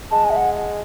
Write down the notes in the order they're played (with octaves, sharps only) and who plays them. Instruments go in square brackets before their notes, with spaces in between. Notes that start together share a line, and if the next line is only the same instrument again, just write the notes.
[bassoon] G#3 [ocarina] A5
[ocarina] G#5
E5
F#5